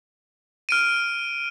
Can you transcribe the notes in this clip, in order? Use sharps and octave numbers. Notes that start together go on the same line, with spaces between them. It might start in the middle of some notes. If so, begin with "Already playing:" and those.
F6 D7 D#7